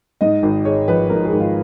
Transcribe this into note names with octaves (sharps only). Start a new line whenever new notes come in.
G#2 D#5
G#1
G#3 C#5
F3 B4
G#2 A#4
G#4
G#1
F4